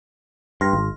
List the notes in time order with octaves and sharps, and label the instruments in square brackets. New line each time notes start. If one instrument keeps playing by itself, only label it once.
[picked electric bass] G2 [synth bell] C6 F6 A#6
[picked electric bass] G#1